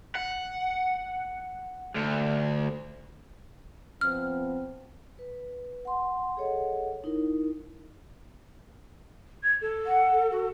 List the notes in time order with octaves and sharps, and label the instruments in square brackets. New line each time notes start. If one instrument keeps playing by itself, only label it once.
[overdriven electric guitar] F#5
D2
[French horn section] F3 B3 C4 [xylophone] F6
[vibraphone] B4
F#5 C6
G#4 A4 C#5 D#5 F#5
D#4 E4 A#4
[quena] G#6
A4
[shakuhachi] F#5
F#4